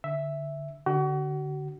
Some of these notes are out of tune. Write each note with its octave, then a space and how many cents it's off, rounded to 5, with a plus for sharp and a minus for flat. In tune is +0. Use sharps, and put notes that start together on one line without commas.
D3 +0 E5 +0
D3 +0 F#4 +35